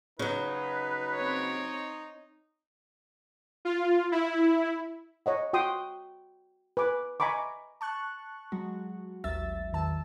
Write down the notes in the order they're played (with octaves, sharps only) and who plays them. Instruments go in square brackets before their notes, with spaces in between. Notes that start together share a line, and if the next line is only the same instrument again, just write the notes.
[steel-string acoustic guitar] C#3 F#3 [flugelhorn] D#4 [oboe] B4
[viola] C4 C#5
[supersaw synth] F4
E4
[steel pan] C#5 D#5 F#5
F#4 G5 C6 D#6
B4 G#5 D6
D#5 G#5 A#5 B5 C#6 D6
[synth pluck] A5 C#6 F#6
F#3 G#3 F#4
A1 D#2 F#3 E5 E6 A6
E2 D#3 A5 E6